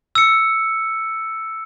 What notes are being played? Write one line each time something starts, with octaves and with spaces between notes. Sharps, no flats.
E6 C#7